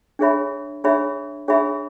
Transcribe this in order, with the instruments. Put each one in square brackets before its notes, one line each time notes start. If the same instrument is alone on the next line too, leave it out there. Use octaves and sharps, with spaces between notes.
[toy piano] D4 G#4 C#5 E5 B5
D4 G#4 C#5 E5 B5
D4 G#4 C#5 E5 B5